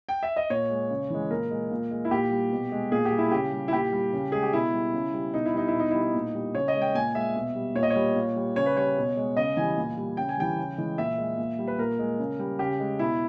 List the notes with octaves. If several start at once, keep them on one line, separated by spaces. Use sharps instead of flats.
G5
E5
D#5
A#2 C#5
G#3
C#3
E3 G#3
A#2 A#4
G#3
A#2
G#3
E4
A#2 G4
G3
B2
G#3
A#2 G#4
G4
G3
E4
C#3 G4
G3
E4
A#2 G4
G3
C#3
G#3 G#4
G4
B2 E4
G3
C#3
G3
B2 D#4
E4
G3 D#4
E4
B2
D#4
G3 E4
D#4
A#2
G3
C#3 C#5
D#5
G#3
G5
A#2 G#5
G#3 E5
B2
G3
A#2 C#5
D#5
C#5
G3
A#2
G3
C#3 C#5
B4
G3 C#5
B2
G#3
C#3 D#5
E3 G3 G#5
A#2
G3
C#3 G5
G#5
E3 G3 G5
C#3
E3 G#3
A#2 E5
G#3
A#2
G3
B4
A#2 A#4
G#3
C#3
G3
C#3 G4
G#3
B2 E4